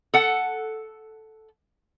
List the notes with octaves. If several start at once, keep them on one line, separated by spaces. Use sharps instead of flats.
A4 F#5